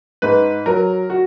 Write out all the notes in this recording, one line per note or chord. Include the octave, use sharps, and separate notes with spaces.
G#2 B4
F#3 A#4
F#4